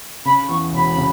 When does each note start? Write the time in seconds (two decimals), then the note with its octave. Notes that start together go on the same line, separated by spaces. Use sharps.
0.25 C#3 B5
0.49 E2 C#6
0.73 E1 B5
0.97 C#3